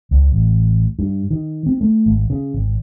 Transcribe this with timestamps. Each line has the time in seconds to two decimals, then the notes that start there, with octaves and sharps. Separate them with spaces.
0.11 C#2
0.32 A1
0.99 G2
1.31 D#3
1.66 C4
1.81 A3
2.06 G#1
2.30 C#3
2.54 G#1